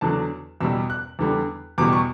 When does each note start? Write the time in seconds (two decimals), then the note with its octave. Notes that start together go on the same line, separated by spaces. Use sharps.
0.01 E2 D3 F#3 A5
0.61 E2 B2 G3 E6
0.90 F#6
1.19 E2 D3 G3
1.78 E2 B2 G3 D6
1.93 C#6